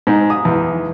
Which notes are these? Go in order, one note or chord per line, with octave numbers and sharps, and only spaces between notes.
G#2
D#6
E2